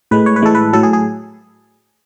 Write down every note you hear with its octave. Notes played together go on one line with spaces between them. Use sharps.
A2 G#3 B4
C#5
B4
A2 E3 G#3 A4
B4
A2 F#3 A4
G#4
G#4